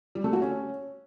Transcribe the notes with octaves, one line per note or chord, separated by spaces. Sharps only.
G3
A3
F#4
C#4